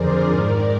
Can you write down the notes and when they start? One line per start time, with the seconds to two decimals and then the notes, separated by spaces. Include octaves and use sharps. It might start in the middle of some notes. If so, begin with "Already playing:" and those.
Already playing: F2 D3 F3 G#4 A#4 C5 D5
0.27 G#2 D#3